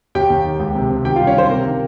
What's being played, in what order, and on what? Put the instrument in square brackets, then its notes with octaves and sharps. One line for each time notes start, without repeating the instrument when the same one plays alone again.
[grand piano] D#2 G4 G5
D#2
D#3
C#2
C3
C3
D#3 G4 G5
G2 F4 F5
C#4 C#5
D#3 C4 C5
C3 A#3 A#4
D#3